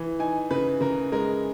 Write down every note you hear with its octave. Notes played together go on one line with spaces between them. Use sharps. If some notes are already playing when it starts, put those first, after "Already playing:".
Already playing: E3
D#4 G#5
C#3 B4
C#3 A#4
G#3 A#4